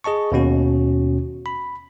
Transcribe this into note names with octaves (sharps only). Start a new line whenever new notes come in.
G#4 D#5 A5 C#6
D#2 B2 C#4 F#4
B5